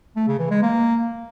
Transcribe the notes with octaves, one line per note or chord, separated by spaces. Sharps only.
A3
C#3
E3
G#3
A#3